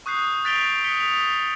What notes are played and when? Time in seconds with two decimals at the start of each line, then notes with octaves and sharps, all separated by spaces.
0.06 C#6 D#6 F#6 G6 C7
0.44 F#6 A6 B6 D7 F7 G7
0.84 D#6 B6 C#7 G7
1.01 D#6 B6 F7